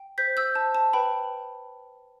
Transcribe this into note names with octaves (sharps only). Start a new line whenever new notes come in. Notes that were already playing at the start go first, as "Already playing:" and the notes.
Already playing: G5
C5 G6 B6
E6 G6
C5 A5
A5
B4 G5 B5